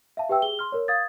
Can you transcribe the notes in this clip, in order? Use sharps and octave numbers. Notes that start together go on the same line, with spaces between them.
E5 F5 A5
G4 B4 E5 G5 E6
G#4 G7
C6 F6
A#4 C#5
F5 D#6 G#6 A6